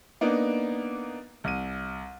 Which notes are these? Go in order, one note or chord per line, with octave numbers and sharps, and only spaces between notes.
A#3 B3 D4 D#4
C2 D#7